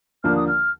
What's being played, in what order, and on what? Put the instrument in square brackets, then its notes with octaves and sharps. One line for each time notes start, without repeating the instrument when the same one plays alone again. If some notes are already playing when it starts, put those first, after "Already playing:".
[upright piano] D#2 D3 F3 A#3 D4 [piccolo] F6
[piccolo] D#6
F6